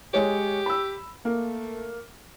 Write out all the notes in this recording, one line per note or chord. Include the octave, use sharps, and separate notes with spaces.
G#3 G4 C#5
B5 E6
A3 A#3